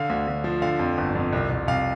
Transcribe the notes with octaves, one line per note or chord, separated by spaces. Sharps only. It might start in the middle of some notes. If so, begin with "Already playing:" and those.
Already playing: D3 F5
D2
D2
F3
D3 F5
F2
G1
F2
C2
C2
C2 F5